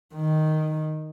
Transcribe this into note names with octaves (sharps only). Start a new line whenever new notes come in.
D#3